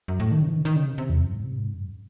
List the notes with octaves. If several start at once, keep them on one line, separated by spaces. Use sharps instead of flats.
F#2
A2
D#3
C#3
E3
D#3
D#3
C#3
C3
C3
E2
F#2
G#2
C3
G#2
F#2